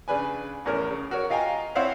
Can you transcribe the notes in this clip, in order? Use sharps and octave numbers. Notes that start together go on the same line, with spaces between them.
C#3 D4 B4 G#5
E2 A2 C#4 A#4
C#3
F#4 A#4 C#5
F4 D#5 F5 G5 G#5 A#5
C4 E4 C5 C#5 F5 F#5